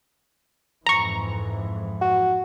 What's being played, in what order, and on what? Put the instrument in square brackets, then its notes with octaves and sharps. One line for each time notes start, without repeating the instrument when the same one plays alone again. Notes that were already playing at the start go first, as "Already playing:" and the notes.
[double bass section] F2 G#2 E3 [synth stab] A#5 C#6
[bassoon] F#4